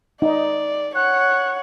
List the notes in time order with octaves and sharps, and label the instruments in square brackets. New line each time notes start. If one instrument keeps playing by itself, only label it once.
[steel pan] D#4 D#5 [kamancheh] D5
[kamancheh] C#5 F#5 [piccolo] F#6